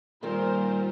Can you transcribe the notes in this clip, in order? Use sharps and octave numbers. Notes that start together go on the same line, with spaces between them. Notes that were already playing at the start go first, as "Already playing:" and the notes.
A#2 D#3 G3 C4 F4 A#4 C5